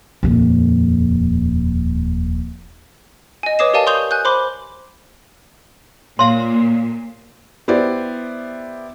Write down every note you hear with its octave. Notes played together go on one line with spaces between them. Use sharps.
D#1 F2
D#5 G#5
B4 C#5 D6 D#6 C7 E7
G4 A#4 D5 F5 G#5 A5
C6 C#6 D#6 G6 F7 G7
G#5 F#6 G6
C5 B5 C6 D6
A#2 C#5 F5 C6
B3 E4 G4 C5 D5